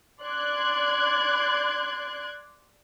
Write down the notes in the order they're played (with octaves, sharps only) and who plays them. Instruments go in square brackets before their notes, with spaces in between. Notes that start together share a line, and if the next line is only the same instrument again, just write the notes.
[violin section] D5 C6 F#6 G#6